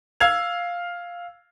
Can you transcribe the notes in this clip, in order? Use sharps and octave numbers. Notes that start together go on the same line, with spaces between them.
F5 E6 G#6 F7